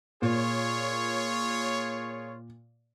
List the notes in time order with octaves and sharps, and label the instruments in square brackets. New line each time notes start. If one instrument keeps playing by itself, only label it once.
[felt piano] A#2 [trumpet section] F4 G#4 C#5